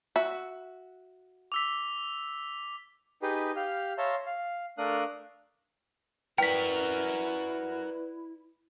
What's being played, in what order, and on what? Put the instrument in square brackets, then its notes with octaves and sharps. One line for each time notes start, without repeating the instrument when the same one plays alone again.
[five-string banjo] F#4 E5
[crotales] D6 E6 B6
[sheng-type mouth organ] D#4 G4 G#4 B4
G4 F5 F6
C#5 E5 F5 A5 A#5 C6
F5
A3 D4 A#4 F5 D#6 F#6
[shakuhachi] E4 [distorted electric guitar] F#4 A#4 [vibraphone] B4 D5 [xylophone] G5 B6